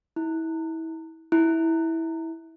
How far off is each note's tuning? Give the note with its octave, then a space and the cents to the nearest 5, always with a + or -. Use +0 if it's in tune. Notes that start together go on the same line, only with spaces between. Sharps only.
E4 -30
E4 -15